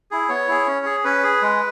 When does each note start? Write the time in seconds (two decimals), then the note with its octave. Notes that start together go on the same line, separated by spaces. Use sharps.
0.11 E4 G#4
0.29 B3 C#5
0.48 E4 G#4
0.67 C#4
0.86 G#4
1.04 C#4 B4
1.24 G#4
1.42 G#3